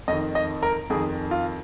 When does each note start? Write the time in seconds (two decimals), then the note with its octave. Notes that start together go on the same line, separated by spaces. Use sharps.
0.08 F2 D#3 D#5
0.35 D#5
0.63 A#4
0.90 F2 D#3 G#4
1.31 F4